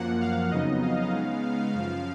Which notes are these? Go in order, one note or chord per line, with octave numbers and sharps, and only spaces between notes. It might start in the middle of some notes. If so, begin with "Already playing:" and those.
Already playing: F#2 F3 A#3 F#5
F5
F2 C#3 F#3 B3 D#4 D#5
F5
C#3 G#3 B3 D#4
F#2 C#3 F3